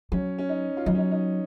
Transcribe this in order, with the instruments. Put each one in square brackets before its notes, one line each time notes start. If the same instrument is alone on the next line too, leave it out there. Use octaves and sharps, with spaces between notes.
[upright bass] F#3 [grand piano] C#4
[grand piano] C#4
D#4
F4
[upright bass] F#3 [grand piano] D#4
[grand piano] C#4
D#4
D#4